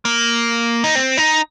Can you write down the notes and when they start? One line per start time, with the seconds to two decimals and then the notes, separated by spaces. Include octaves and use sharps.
0.05 A#3
0.84 D#4
0.95 C4
1.17 D#4